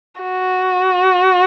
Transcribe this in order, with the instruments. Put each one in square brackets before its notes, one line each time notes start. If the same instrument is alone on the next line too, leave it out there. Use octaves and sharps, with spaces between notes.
[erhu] F#4